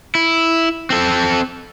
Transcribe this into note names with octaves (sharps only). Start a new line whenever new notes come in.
E4
C4 A4